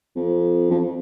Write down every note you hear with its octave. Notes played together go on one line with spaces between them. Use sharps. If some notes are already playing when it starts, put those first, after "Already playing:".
F2
F2